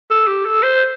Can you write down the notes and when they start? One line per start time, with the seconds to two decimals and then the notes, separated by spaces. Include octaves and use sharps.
0.10 A4
0.28 G4
0.45 A4
0.63 C5